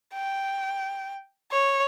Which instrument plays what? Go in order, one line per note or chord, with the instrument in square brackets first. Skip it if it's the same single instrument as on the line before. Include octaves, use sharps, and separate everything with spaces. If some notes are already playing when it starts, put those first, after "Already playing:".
[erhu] G5
C#5